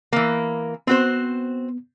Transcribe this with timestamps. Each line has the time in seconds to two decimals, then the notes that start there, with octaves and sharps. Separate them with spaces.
0.13 E3 A#3
0.87 B3 C4 F#4 C5